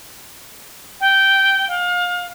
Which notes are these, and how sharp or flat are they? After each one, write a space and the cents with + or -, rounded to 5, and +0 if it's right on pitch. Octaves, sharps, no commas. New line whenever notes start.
G5 -10
F5 +30